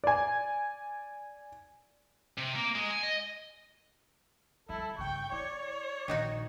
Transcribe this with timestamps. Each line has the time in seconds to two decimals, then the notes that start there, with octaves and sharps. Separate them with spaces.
0.04 D5 G#5
2.38 C3
2.56 A#3
2.75 G#3
2.90 G#5
3.03 D#5
4.69 D3 G3 E4 A4
4.98 G2 C#3 G5 C#6
5.32 E4 C#5 D5
6.08 A#1 D#3 D#4 F#4